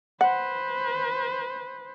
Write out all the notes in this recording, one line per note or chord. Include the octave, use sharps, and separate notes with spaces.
B4 C5 F#5